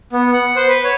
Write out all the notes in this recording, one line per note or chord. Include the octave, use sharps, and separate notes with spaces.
B3
F#5
C5
B4
C#5